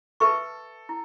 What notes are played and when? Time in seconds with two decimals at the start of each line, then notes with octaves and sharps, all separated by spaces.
0.20 A4 B4 E5 A5 C#6
0.89 E4